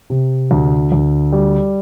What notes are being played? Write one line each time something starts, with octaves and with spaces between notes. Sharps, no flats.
C3
D2
D2
G3